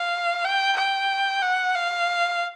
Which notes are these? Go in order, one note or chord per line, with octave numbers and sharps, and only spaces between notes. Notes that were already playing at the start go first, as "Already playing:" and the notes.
Already playing: F5
G5
G5
F#5
F5